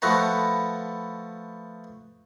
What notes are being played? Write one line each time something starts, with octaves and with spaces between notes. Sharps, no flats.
F3 A3 B3 B4 A#5